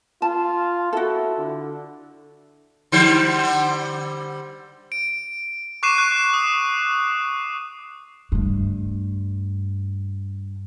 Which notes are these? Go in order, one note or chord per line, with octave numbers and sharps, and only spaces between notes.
F4 A5
E4 F#4 A4
D3
D3 G3 C5
D7
C#6 D6 F#6 C7 D#7 E7
C#6 F#6
D#6
G2 A3